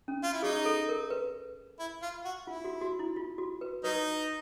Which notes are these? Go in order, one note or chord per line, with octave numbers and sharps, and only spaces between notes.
C#4
F4
E4
F#3 D#4 G#4
A4
A#4
B4
E4
F4
F#4
E4 F4
F#4
F#4
E4
F4
F#4
B4
F#3 D#4 B4